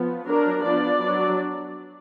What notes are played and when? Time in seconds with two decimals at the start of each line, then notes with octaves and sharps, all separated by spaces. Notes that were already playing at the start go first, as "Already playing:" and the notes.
Already playing: F3 B3
0.27 F#3 D4 A#4
0.64 F3 B3 D4 D5
1.01 F#3 D4